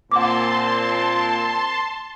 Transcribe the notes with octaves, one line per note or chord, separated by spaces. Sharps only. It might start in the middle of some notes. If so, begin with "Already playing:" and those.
A#2 C4 F#5 A5 C6 D6